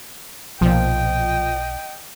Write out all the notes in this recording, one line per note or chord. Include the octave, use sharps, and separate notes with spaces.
B1 A#2 F3 D#5 G5